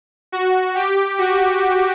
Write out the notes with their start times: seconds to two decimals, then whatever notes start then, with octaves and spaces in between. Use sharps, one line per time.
0.32 F#4
0.75 G4
1.19 F#4